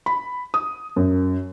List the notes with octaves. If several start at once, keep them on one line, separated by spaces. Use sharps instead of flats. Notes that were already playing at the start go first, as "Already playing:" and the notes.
B5
D#6
F#2